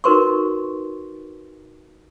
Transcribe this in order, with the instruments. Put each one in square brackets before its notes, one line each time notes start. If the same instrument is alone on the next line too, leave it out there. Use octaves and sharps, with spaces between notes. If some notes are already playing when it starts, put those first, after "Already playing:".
[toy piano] D#4 F#4 A#4 B4 C6 C#6